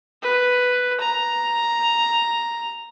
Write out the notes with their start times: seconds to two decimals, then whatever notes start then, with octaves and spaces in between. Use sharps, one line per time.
0.22 B4
1.00 A#5